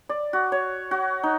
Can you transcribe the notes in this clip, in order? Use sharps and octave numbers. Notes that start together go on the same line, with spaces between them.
D5
F#4
C#5
F#4
D#4